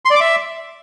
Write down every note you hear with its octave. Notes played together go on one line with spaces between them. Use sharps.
C6
D5
D6
E5